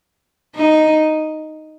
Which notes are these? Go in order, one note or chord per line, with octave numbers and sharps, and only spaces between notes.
D#4